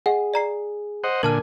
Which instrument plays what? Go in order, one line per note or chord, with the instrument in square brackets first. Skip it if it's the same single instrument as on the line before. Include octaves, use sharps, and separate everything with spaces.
[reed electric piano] G#4 [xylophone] D#5 F#5
[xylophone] D5 A#5 C7
[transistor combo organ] C5 D#5 F#5
[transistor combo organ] A#2 D3 G#5 [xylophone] A#4 A5 F6